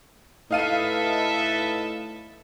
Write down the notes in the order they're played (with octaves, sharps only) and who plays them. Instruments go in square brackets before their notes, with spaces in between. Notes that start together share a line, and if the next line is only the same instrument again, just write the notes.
[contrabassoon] A2 [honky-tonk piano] D#4 F5 D#7 [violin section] A4 B4 E5